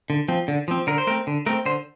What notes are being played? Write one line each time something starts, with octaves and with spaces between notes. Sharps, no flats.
D3
F3 C4
D3
F3 C4
D3 A#4
C5
A3 C4 A#4
D3
A3 C4 A#4
D3 C5